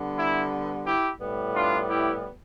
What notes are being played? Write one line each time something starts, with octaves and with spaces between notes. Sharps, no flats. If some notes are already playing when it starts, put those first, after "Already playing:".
Already playing: D3 G3 B3
E4
E4 G4
A2 G3 B3
D4 F4
E4 G4